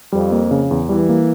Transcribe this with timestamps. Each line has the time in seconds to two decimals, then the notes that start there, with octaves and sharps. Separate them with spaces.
0.12 F2 G3
0.32 A#3
0.51 C#3
0.71 E2
0.89 E3 G3
1.09 A#3